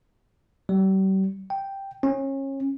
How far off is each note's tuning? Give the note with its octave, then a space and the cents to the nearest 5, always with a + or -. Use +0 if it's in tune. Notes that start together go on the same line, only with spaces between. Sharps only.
G3 -40
G5 +0
C#4 -30